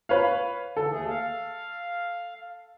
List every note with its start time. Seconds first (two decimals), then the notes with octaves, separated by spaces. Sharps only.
0.09 B4 C#5 F5
0.77 D3 E3 A4
0.90 D#2 A3 G#4
1.09 F5